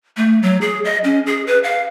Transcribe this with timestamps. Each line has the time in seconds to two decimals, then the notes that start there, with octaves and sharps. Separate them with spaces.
0.17 A3
0.43 F#3
0.61 G#4
0.85 D#5
1.04 C#4
1.26 G#4
1.47 B4
1.64 F5